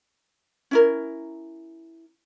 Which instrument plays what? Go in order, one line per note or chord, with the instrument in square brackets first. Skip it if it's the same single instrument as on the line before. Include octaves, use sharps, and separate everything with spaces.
[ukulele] C#4 E4 A#4